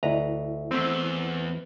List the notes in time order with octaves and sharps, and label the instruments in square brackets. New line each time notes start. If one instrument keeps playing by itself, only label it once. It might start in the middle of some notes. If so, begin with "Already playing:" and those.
[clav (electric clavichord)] D2 B4 A#5 [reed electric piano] E4 D#5
[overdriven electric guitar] E2 [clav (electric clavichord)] A3 C4